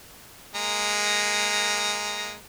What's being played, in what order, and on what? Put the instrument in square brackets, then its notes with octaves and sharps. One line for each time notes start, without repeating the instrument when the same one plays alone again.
[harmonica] G#3 A#3 A#5